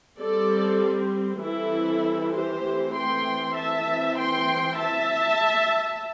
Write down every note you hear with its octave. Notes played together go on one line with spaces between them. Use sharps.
G3 C4 A4 D5
E3 G3 C4 E4 A4
G4 C5
E3 A3 C4
G5 C6
E5 A5
E3 C4
G5 C6
E5 A5